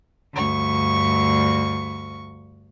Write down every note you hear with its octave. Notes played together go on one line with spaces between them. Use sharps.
D2 G2 C#6